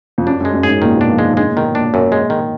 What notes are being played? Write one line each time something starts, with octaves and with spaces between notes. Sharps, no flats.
F2
F#2 D4
F#2
G#3
F#2
F#2 G#2 G#4
A#2 D#3
B2
D4
F3
G#3
D#3
D3 G#3
A#2
B2 D#3
A#2 D4
F#2
G#3
D#3